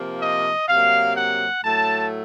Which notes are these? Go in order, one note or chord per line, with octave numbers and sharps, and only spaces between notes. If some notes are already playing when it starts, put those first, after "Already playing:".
Already playing: C3 F3 A#3
D#5
C3 F#3 A#3 F5
F#5
A2 F#3 A3 A5